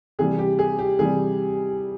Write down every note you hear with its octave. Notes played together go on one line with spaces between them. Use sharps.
C3 E3 G3 G#4
G4
G#4
G4
C3 E3 G3 G#4